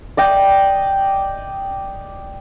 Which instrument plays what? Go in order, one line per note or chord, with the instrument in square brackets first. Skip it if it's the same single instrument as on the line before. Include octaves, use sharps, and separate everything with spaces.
[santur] D5 D#5 G5